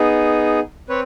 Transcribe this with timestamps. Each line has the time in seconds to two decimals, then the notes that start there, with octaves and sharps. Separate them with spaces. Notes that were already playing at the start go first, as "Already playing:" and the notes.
Already playing: B3 D#4 G#4
0.89 C4 B4 C#5